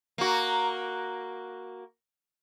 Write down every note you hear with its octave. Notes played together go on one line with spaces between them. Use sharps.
A#3 F#4